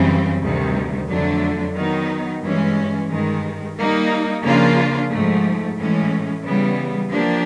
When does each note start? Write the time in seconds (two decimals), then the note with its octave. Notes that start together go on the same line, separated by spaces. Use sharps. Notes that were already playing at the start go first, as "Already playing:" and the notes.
Already playing: F#2 C#3 E3 G3 C4
0.42 D2 C3 D#3 G3
1.09 F2 D3 F#3 A3 D4
1.76 D#3 F#3 B3 D#4
2.43 G2 E3 G#3 C#4
3.10 G2 D#3 G#3
3.76 G3 A#3 D#4
4.43 C#3 F3 A#3 D4 F4
5.10 G#2 F3 A3
5.76 A2 E3 G#3 C#4
6.44 C#3 E3 G3 B3
7.10 F3 A#3 D4 G4